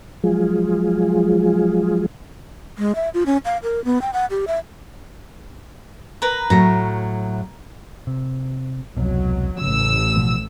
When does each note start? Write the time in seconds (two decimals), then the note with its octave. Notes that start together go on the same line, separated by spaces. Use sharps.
0.24 F3 F#3 G#3 F4 G#4
2.78 G#3
2.95 E5
3.14 F4
3.26 C#4
3.45 F5
3.63 A#4
3.85 B3
4.02 G5
4.13 F#5
4.30 G4
4.47 E5
6.22 A#4 B4 A#5
6.50 A2 F#3 A3 A#5
8.07 C3
8.97 E1 C2 B2 F#3
9.61 A1 C#3 E6
10.16 B2 F3 B3